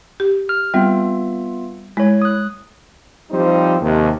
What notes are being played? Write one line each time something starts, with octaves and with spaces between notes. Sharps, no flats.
G4
F6
G3 B3 C4 F4 E5
G#3 E4 C#5
D#6 F#6
F3 G3 C4 D#4 G4 C5
D#2 C3